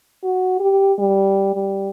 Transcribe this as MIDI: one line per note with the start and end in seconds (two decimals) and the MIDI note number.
0.23 0.56 66
0.60 0.93 67
0.98 1.50 55
1.54 1.90 55